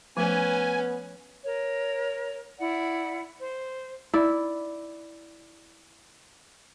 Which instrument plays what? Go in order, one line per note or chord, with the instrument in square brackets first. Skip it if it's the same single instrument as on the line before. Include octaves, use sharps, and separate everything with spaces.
[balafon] F3 A3 [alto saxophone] B3 [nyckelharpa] C#4 B4 [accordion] G#5
[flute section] A#4 C#5
E4 D5 F#5
C5
[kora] E4 D5